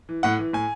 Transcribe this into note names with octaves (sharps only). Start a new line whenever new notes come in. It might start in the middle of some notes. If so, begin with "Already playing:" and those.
E3
A2 F#5
E3
A2 G#5